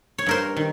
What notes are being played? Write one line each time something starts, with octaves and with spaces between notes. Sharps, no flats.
C#5
G2 A#4 C5
D#3